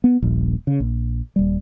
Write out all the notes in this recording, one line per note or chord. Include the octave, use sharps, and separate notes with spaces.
B3
D#1 A#1
C#3
A#1
D#1 G3